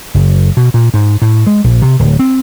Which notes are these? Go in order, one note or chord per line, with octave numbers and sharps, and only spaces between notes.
F#1
B2
A#2
G#2
A2
G#3
A#1
C3
D1
C4